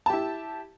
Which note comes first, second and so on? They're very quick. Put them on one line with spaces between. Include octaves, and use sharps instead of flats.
A5 G4 E4